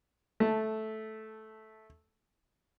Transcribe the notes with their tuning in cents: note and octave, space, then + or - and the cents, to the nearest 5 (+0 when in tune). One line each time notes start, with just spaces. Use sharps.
A3 -10 A5 +0